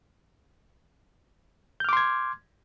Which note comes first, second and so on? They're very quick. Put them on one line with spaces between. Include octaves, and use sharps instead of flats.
G6 F6 D6 C6 G#6